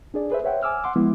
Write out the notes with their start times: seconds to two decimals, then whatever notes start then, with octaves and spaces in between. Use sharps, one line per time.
0.14 D4 G#4 D5
0.30 G#4 B4 C5 E5
0.44 C5 C#5 E5 F#5 G5
0.63 G#5 D6 E6 F6
0.84 F#5 C6 D6
0.96 F3 G#3 B3 E4